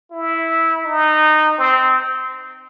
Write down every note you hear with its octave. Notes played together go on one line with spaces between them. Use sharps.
E4
D#4
C4